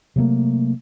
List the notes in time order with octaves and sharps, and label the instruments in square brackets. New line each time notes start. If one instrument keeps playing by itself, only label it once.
[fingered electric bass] C3 F#3 A3 A#3